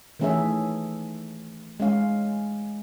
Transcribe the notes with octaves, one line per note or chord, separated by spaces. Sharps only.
D#3 E3 A3 C#4 G#4 E5
G#3 C#4 F5